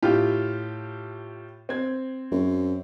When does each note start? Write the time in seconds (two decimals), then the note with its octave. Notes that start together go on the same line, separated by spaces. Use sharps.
0.03 A2 F4 G4
1.69 C4 G#6
2.31 F#2